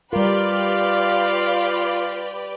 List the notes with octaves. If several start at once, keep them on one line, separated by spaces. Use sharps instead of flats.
G3 F4 G4 A#4 B4 D5 F5